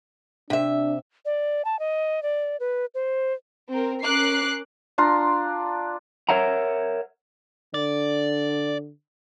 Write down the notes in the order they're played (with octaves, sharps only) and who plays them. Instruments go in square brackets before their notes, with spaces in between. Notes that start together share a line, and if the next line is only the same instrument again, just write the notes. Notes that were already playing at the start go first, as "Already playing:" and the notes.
[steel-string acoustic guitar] C3 E5 [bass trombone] D4
[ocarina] D5
A5
D#5
D5
B4
C5
[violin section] C4 A#4
C#4 A#4 D6 F#6 C7
[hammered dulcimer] D4 F4 A#5 C6
[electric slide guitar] A#4 C5 C#5 E5 F#5 A#5
[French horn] D3 [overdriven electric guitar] D5